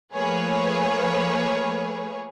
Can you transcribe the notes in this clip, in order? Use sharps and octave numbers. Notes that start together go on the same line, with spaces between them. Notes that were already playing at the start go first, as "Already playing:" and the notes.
F3 A3 A#3 G#4 B4 C#5